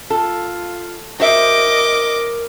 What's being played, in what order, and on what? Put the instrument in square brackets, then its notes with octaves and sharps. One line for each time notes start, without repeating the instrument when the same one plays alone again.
[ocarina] F4 [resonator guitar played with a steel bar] A4
[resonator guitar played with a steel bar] F#4 C5 E5 [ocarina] A#4 [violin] D#5 D6